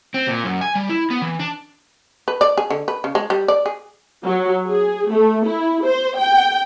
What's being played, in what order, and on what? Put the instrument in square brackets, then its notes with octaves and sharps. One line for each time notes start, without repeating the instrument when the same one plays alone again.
[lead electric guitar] C4
A#2
F#2
G#5
G3
E4
B3
E3
D4
[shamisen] B4
D5
G#4
D3
B4
C#3
G#3
G3
D5
G#4
[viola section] F#3
G#4
A3
E4
C5
G5